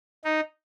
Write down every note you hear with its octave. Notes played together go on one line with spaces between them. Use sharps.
D#4